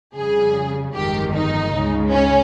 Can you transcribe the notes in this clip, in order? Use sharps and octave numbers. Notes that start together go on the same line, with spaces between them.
F2 C#3 G3 G#4
G1 F2 D#3 G#3 G4
D#4
C#2 C#3 G#3
C#4